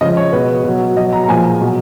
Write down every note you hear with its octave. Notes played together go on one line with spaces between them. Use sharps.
C#3 F3 G#3 D#5
C#5
B2 G#3 B4
B2 F#3
B2 F#3 D#5
A#5
A#5
A#2 F3 G#3 G#5
B2 F#3